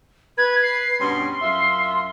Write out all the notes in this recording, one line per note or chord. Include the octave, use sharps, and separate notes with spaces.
B4 G#6
C7
G2 B2 C#4 C6
F#2 F4 E5